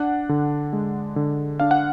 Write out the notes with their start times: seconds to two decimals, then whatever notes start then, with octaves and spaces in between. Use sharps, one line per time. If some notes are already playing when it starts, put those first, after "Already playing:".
Already playing: D4 F#5
0.29 D3
0.73 G#3
1.16 D3
1.60 D4 F5
1.71 F#5